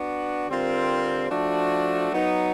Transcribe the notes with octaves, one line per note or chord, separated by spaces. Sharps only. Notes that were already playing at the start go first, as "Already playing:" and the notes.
Already playing: B3 D4 F#4
D3 G3 C4 F4 A#4
F3 A3 D4 F#4
F#3 B3 D#4